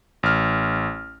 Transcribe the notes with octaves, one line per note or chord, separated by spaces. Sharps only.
A1 F6